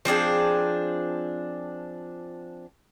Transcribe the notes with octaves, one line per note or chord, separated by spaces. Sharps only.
F3 C4 D4 G#4